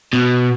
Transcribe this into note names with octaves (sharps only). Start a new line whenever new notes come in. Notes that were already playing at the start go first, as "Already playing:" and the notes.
B2